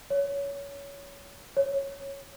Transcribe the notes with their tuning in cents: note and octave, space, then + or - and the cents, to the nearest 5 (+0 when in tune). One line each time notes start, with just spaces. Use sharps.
C#5 +20
C#5 -5